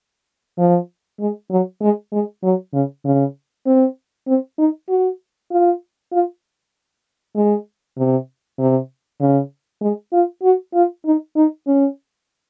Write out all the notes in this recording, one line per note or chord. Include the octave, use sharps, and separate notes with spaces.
F3
G#3
F#3
G#3
G#3
F#3
C#3
C#3
C4
C4
D#4
F#4
F4
F4
G#3
C3
C3
C#3
G#3
F4
F#4
F4
D#4
D#4
C#4